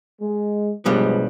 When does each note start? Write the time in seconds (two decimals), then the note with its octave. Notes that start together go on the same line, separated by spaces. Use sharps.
0.20 G#3
0.86 B1 G2 F3 G3 G#3 B3